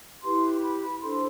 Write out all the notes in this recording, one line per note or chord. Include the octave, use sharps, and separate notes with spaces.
E4 G4 B4 C6
B5
D4 A4 C5 C6